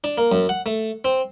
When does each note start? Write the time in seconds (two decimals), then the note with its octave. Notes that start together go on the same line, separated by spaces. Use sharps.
0.04 D4
0.18 A#3
0.32 F#2
0.49 F#5
0.66 A3
1.05 C4